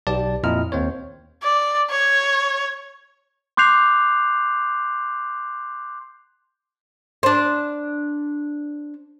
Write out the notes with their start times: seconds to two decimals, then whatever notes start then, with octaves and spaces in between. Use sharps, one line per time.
0.07 B1 G4 D5 A5
0.43 F2 A#2 E4 D#5 F6
0.72 D#2 C4 C5 C#5
1.42 D5
1.90 C#5
3.57 C6 D6 F#6 G6 C7 F7
7.23 D4 C5